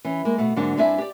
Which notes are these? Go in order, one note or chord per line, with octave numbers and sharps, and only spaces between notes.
E3 C#4
G#3 A#3
B2 A3
G#2 D3 F#3 A#3 D4
G2 C4 D4 E4 E5 G#5
G4 D5